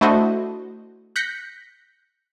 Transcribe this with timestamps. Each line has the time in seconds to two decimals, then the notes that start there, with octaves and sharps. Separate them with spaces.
0.01 A3 D4 E4 F#4 C5 D#5
1.16 F#6 G6 A#6 B6 C#7